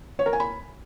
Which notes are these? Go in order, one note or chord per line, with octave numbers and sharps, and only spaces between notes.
C#5
A#4
G#5
B5